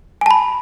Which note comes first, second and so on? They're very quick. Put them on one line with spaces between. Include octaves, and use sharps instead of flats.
G#5 A5 B5